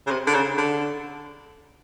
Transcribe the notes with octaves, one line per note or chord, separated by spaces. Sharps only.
C#3
C3
D3
C#3
D3